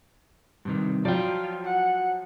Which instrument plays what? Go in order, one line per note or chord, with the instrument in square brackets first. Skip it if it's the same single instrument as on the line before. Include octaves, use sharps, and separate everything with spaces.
[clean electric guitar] G2 C3 D#3
[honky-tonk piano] F3 F#3 [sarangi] F4 [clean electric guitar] D5 G5
[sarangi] F#5